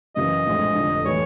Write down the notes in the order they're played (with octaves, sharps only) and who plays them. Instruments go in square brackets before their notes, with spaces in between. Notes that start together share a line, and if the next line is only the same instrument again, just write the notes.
[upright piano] F#2 C#3 E3 [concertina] D#5
[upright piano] A#1 A2 F3 G#3 C4
F1 F2 D3
[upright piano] A2 E3 G3 [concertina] C#5